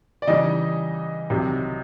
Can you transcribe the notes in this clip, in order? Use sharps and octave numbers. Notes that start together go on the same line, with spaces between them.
D5
C#3 E3 G3 D#4 D#5
C2 C3 D#3 F#3